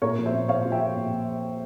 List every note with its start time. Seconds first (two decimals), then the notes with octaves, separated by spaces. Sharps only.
0.02 A#2 A#4 C#5
0.18 F3
0.26 C5 E5
0.34 A#2
0.48 A#2 C#5 F5
0.65 F3
0.72 E5 G5
0.80 F3
0.96 A#2